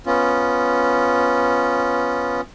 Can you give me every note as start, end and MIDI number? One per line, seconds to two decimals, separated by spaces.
0.06 2.41 59
0.06 2.41 61
0.06 2.41 65